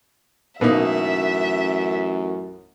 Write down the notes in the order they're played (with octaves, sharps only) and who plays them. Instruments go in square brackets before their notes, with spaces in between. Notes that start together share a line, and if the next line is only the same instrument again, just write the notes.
[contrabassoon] A1 [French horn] F#2 [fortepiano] B2 A#3 D#4 [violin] E5